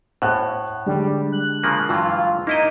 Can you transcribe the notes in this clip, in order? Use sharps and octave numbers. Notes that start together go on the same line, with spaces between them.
A2 C5 F#5 F#6
D3 G3 G#3
F#6
C#3 F3 A#3
G2 E3 F#3 F4
A#3 D#4 E4 D#5